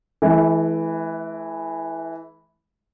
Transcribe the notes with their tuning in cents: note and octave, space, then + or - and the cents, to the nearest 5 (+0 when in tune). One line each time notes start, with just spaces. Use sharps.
E3 -5 A3 -45